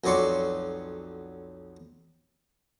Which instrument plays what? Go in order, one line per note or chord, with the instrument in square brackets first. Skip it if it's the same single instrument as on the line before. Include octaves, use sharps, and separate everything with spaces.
[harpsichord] B1 F2 F#3 D5 C6 C#6